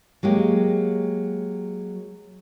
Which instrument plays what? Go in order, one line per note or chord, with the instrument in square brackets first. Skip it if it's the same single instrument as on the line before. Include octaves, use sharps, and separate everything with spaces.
[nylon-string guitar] F#3 G#3 A#3 G4